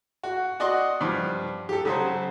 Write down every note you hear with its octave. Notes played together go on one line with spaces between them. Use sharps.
F#4
F#4 D5 D#5 C6
G2 F3
G4 A4
C#3 F#3 C5